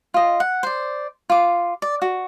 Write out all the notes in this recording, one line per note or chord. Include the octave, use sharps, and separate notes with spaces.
F4 D#5
F#5
C5 D5
F4 D6
D5
F#4